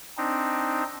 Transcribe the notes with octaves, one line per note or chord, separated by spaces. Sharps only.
C4 D4 D#4